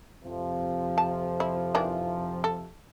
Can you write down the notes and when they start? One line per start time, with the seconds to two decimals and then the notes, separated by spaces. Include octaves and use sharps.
0.24 F2 C3 F3
0.98 A5
1.40 E4
1.75 D#3 E3 D4
2.44 A4